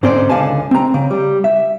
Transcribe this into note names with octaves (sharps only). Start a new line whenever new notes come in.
G#2 D3 C4 C#4 C5 D5
C#2 D3 F5 G#5 A5
C4 A#5
C#3
G3
E5